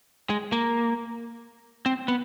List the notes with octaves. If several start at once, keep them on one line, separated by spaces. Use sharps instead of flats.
G#3
A#3
C4
B3